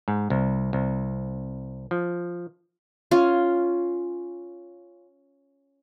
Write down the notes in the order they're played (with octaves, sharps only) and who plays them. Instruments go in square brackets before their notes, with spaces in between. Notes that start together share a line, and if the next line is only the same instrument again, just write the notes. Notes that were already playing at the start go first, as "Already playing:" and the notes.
[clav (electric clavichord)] G#2
C2
C2
F3
[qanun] C#4 F4